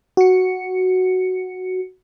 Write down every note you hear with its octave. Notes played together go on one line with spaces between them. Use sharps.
F#4 C#7